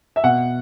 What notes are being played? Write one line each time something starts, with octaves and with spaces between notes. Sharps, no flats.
E5
B2 F#5